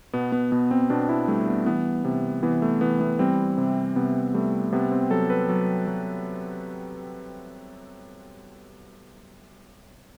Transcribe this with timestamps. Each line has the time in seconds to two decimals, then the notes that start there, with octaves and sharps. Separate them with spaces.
0.13 B2 B3
0.32 B3
0.52 B2 B3
0.71 C4
0.90 B2 D4
1.09 E4
1.28 G3 A3
1.47 B3
1.66 E3 B3
2.05 C3
2.43 E3 B3
2.62 A3
2.81 E3 B3
3.01 B3
3.19 G3 C4
3.58 C3
3.96 C3 B3
4.34 G3 A3
4.72 C3 B3
4.92 C4
5.11 F#3 A4
5.30 B4
5.49 F#3
5.87 F#3